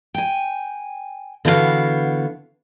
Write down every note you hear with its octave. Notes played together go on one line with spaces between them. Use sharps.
G5 G#5
D3 E3 B3 E4 F#4 F5